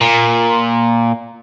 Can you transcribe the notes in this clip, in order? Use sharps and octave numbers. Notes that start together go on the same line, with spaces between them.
A#2